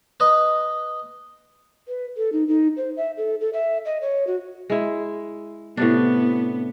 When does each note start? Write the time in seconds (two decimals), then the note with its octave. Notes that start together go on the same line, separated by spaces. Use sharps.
0.20 B4 D#5
1.88 B4
2.17 A4
2.32 D#4
2.48 D#4
2.77 C5
2.97 E5
3.17 A4
3.41 A4
3.53 E5
3.85 D#5
4.01 C#5
4.27 F#4
4.70 G#3 E4
5.77 A2 C3 B3 D4